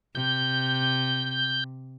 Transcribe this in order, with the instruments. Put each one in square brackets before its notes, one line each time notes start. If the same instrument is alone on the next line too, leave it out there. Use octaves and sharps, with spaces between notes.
[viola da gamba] C3 [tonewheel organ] G6